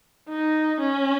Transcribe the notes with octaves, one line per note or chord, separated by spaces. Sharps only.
D#4
C#4